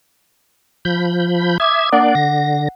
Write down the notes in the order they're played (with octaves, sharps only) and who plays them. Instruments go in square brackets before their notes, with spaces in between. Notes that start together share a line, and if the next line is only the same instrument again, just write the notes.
[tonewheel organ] F3 B5 G6
[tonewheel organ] E5 G#6 [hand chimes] D6 D#6
[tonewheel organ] A#3 D4 D5 [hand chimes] F#5
[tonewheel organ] D3 A#6